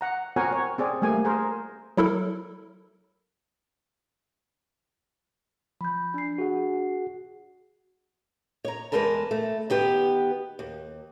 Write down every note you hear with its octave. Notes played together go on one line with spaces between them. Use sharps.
F#5 A#5
C4 F#4 A#4 C#5 F#5 G#5
C#5
C4 G#4 D5
G3 A3 A#3 G#5
G#4 A#4 C5
F#3 E4 A4 A#4
F3 B5 G6
D4 C7
F#4 G#4 F#5
C#5 A#5
E2 G2 G#3 A#4 B4 A5
A3
D#3 B3 G4 B4
D#2